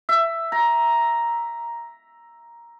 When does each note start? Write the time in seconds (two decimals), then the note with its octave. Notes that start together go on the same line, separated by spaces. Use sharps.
0.09 E5
0.52 A#5